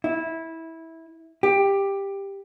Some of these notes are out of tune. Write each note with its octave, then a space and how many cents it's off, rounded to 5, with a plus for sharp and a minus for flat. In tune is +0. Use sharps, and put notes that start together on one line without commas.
E4 -15
G4 +10